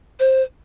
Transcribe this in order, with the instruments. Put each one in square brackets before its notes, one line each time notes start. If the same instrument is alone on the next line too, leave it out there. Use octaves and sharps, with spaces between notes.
[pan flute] C5